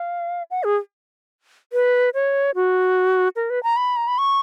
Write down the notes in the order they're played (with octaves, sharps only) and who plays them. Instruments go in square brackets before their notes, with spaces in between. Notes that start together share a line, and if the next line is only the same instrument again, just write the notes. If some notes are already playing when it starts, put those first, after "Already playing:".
Already playing: [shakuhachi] F5
F#5
G#4
B4
C#5
F#4
A#4
B4
A#5
B5
A#5
B5
C#6